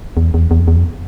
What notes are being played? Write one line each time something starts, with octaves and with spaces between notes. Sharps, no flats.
E2
E2
E2
F2
E2
F2